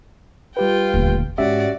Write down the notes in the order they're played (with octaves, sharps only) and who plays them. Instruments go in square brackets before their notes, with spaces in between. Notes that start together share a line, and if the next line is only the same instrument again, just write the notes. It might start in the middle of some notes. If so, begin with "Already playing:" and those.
[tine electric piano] G3 G4 B4 [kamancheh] F4 G5
[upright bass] D#1 D2
[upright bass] G#2 [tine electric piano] C#4 G4 E5 [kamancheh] F#4 D5